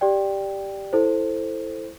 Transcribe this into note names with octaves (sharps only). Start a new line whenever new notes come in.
G4 D5 G5
E4 A4 C5